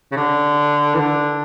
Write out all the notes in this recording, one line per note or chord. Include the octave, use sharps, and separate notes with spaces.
C#3
D3
E3
D3